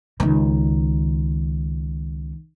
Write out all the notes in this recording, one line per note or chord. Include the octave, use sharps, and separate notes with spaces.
C#2 D#3